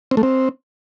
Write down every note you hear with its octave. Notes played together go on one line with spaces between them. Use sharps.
C4
A3
C4